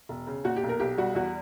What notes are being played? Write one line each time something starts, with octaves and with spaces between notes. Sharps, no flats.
E1
C#3
A#2 F#4
G4
B1
A#4
B1 G4
G3 F#4
E2 F#4